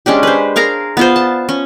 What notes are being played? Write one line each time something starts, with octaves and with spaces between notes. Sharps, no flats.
G#3 C#4 D4 G4
B4 C5
G#4 A#4 F5 A#5
B3 F4 C5
A5
C#4